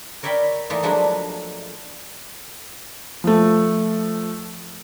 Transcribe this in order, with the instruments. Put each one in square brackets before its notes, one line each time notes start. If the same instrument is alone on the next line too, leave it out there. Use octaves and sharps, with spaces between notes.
[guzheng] A#4 C#5 D5 E5 G5 B5
E3 A3 A#3 D#4 F4
F3 F#3 G#3 A3 D4 E4
[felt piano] F3 A3